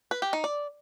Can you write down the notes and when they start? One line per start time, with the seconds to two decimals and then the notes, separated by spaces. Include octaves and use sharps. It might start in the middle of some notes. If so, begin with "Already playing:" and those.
0.11 B4
0.22 G4
0.33 D#4
0.44 D5